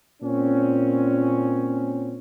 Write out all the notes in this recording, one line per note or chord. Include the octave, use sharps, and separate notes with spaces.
A#2 C4 C#4